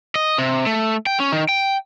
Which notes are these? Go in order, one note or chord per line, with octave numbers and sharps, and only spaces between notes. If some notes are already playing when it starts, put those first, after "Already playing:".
D#5
C3
A3
G5
C#4
D#3
G5